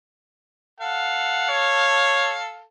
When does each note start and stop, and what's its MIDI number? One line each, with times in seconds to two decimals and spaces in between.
0.80 2.62 69
0.80 2.62 77
0.80 1.45 78
1.49 2.38 73